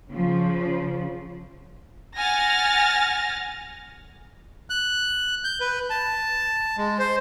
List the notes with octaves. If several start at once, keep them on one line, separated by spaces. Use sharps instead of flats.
C#3 F3
F#5 G#5 F6 A6 A#6
F#6
G6
B4
A5
G#3
C5